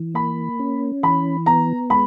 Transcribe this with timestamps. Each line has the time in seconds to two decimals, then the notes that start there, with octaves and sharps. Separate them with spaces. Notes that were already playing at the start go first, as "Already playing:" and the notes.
Already playing: E3
0.14 A#3 B5
0.59 C#4
1.03 E3 B5
1.46 B3 A#5
1.90 G#3 B5